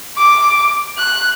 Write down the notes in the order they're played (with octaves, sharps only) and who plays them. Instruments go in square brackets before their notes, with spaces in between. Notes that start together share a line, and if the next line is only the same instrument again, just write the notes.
[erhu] D6
F#6